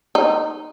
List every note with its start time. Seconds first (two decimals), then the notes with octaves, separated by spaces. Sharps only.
0.15 D#4